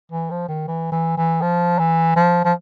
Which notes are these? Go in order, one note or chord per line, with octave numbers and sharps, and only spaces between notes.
E3
F3
D#3
E3
E3
E3
F3
E3
F3
F3